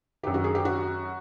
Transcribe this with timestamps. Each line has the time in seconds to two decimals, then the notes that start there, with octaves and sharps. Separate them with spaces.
0.23 F#2 D#3 G4
0.34 F#4
0.44 G#4
0.55 G4
0.65 F#4